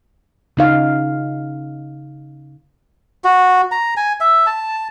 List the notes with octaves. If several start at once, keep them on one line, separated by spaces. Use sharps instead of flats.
C#3 D#4 F5
F#4
A#5
G#5
E5
A5